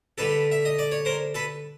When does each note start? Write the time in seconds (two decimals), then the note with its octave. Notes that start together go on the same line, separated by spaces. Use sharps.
0.18 D3 G3 A4 B4
0.52 E5
0.65 D#5
0.79 D5
0.92 C#5
1.05 A#4 C5
1.34 A4 B4